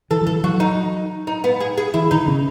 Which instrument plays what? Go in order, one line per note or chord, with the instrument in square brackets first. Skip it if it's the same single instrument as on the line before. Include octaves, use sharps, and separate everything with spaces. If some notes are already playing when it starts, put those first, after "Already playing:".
[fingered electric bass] E3 [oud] A4
[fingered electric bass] F#3
[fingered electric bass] E3 [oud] A4
[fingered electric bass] F#3 [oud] F#4
[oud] D#4
D#4
B3
G#4
G#4
[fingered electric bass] E3 [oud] E4
[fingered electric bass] D#3 [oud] D#4
[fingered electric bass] C#3